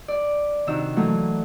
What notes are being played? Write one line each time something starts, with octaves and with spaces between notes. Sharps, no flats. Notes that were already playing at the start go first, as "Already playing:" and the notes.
D5
C3 D#3 D4 D#4 F#4 E6
E3 F#3 A3 A#3